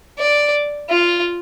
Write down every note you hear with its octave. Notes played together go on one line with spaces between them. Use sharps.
D5
F4